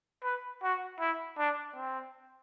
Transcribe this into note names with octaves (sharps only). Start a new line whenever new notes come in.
B4
F#4
E4
D4
C4